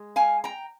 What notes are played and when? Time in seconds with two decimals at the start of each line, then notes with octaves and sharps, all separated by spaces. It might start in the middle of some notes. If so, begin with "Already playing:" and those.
Already playing: G#3
0.16 F5 G#5
0.44 G5 A#5